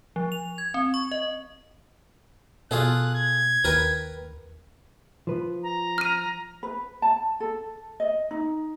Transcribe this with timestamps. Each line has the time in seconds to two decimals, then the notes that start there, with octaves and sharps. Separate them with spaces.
0.16 F3
0.32 F7
0.58 G#6
0.74 C4
0.94 C#6
1.11 D#5
2.71 B2 F4 G#4 A4 F#6
3.15 G#6
3.64 D#2 A#4 B4 G5
5.27 F3 B4
5.63 A#5
5.98 F6 D#7
6.63 B4
7.02 A5
7.40 A4
8.00 D#5
8.31 D#4